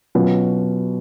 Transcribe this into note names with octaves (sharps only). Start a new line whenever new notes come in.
B2 F#3 C#4 F4 B4